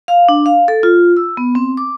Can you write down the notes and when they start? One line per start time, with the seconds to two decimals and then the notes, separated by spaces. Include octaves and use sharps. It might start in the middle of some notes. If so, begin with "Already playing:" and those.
0.08 F5
0.29 D4
0.46 F5
0.68 A4
0.83 F4
1.17 E6
1.37 B3
1.55 C4
1.77 D6